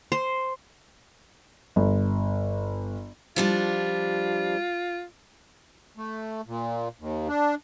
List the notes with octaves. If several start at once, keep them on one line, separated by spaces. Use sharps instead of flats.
C5
G1
F3 G3 D4 F4
A3
A#2
D#2
D4